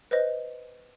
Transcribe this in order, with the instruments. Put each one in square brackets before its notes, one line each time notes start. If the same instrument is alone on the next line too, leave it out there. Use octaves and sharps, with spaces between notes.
[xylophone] B4 C5 D#5